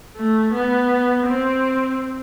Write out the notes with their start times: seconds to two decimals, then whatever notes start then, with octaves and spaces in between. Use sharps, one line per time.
0.16 A3
0.54 B3
1.28 C4